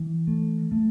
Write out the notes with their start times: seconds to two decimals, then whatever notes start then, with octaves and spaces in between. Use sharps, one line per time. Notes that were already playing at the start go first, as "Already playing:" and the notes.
Already playing: E3
0.27 A3
0.72 A3